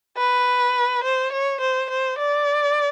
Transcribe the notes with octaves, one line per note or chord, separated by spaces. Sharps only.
B4
C5
C#5
C5
C5
D5